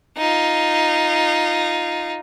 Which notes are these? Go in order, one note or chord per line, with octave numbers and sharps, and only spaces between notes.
D#4 F4